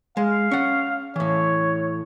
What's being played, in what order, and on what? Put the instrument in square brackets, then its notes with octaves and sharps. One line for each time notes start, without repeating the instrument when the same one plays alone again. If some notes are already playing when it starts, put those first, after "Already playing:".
[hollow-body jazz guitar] G#3 [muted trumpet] F5
[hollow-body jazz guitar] C#4 F#5
[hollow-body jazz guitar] A2 E3 [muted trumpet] C#5